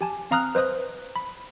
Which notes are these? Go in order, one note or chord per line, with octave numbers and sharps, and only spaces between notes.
G4 G#5 A5
C4 F5 A#5 D#6 F6 F#6
B4 C5 D#5 D#6 F#6
B5